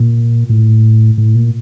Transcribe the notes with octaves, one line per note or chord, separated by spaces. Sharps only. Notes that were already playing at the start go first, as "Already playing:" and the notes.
Already playing: A#2
A2
A2
A#2